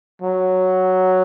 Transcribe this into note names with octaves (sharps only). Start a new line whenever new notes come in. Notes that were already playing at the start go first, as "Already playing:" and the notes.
F#3